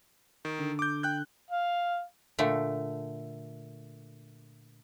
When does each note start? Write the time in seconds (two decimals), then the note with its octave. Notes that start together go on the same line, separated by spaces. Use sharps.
0.45 D#3
0.59 D3
0.79 D6 G6
1.03 G5 F#6 G6
1.50 F5
2.39 A#2 D3 A3